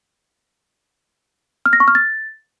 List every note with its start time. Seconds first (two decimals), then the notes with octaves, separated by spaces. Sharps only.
1.66 F6
1.73 A#6
1.80 C#6
1.88 F6
1.95 A6